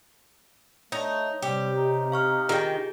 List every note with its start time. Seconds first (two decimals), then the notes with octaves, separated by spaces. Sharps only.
0.92 A3 D#4 C#5
1.42 C3 G3 G4
1.77 D#4
2.12 F5 C#6 F6
2.49 D#3 F4 G4 G#4 G5